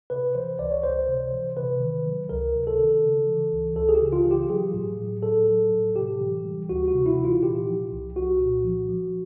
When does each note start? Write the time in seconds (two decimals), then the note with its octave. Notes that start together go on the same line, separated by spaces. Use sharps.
0.10 C3 B4
0.35 E3 C5
0.59 C#2 D5
0.71 C#5
0.83 C#2 C5
1.08 C3
1.33 E3
1.57 C3 B4
1.80 D#3
2.06 F#3
2.29 C#2 A#4
2.55 C3
2.67 A4
2.79 D#3
3.03 C#3
3.27 E3
3.52 C#2
3.76 C#2 A4
3.89 G#4
3.94 G4
4.01 C#3
4.13 F4
4.26 E3
4.31 G4
4.50 F#3 G#4
4.74 A2
4.98 F#3
5.23 A2 A4
5.48 F#3
5.72 A2
5.96 C3 G4
6.20 E3
6.45 G3
6.69 D2 F#4
6.88 F#4
6.94 C3
7.06 E4
7.18 E3
7.25 F4
7.42 A#2 G4
7.67 F3
7.91 C2
8.16 C2 F#4
8.41 A#2
8.64 F3
8.89 F3